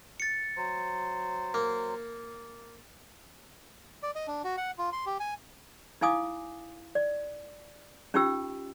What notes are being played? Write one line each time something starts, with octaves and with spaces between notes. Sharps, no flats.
A6 C#7
F#3 C5
A#3
D5
D#5
D4
F#4
F#5
F4
C6
G4
G#5
D#4 E4 F5 G#5 D6 D#6
D5
C#4 D#4 F4 G4 G5 E6